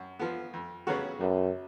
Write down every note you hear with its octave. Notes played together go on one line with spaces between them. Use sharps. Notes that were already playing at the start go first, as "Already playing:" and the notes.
Already playing: F#2
F3 B3
F2
C#3 F#3 B3 F#4
C#2 F#2